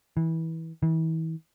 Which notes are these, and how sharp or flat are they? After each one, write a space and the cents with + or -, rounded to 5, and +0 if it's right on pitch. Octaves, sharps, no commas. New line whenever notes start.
E3 -20
E3 -35